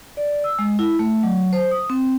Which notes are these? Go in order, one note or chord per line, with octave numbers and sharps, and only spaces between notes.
D5
E6
G#3
E4
A3
F#3
C5
D#6
C4